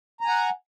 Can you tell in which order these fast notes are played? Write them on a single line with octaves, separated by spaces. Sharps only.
A#5 G#5 F#5